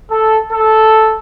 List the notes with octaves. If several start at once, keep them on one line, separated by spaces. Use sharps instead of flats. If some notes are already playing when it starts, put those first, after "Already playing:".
A4
A4